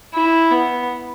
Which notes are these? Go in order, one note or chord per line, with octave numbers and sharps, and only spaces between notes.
E4
B3